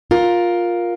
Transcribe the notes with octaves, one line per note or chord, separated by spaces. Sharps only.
F4 A#4